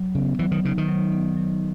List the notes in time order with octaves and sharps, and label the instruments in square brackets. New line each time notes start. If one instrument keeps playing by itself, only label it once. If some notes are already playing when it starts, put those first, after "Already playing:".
Already playing: [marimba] F#3
[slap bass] C#3 [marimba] B3
[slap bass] E3 [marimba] F#3
[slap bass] D#3
[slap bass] C#3 [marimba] D#4
[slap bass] D#3
[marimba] F#3
B3
F#3